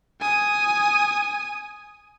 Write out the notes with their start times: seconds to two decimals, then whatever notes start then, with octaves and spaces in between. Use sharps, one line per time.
0.21 G#5 D#6